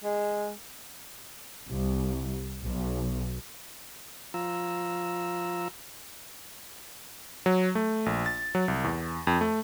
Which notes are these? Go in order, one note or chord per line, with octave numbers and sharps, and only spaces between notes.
G#3
C2
B1
F3 F4 A#5 E6
F#3
A3
A#1
A6
F#3
C2
E2
F2
A3